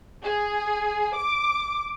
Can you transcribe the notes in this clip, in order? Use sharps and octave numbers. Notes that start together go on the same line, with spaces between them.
G#4
D6